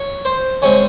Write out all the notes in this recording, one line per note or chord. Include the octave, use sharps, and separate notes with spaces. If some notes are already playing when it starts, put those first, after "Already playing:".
Already playing: C#5
C5
C#3 G#3 C4 C#5